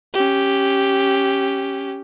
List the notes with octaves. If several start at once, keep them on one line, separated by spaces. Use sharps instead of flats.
C#4 G4